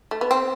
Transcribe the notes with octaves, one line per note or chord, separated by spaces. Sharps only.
A3
B3
C4